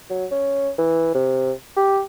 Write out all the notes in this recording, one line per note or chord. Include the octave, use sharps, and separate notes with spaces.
F#3
C#4
E3
C3
G4